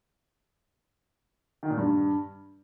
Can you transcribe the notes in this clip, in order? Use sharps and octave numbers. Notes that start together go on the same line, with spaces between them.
D#3
A#2
G2